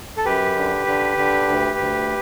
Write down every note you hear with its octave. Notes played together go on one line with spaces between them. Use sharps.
A4
F#2 G4 B4
D3
D3
D3
D2
D2